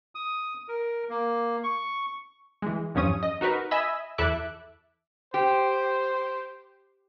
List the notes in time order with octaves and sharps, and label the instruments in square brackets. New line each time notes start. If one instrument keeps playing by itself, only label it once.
[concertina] D#6
A#4
A#3
C#6
[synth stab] E3 G#3
E2 G2 F3 C#4 D#6
D#5
D#4 F#4 A#4 B4
D#5 E5 G#5 B5 E6
E2 E4 A4 E5 D6 F#6
[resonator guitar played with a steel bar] G4 [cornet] C5